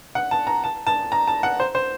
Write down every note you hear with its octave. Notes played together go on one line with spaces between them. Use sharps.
F#5
A5
A#5
A5
A5
A#5
A5
F#5
C5
C5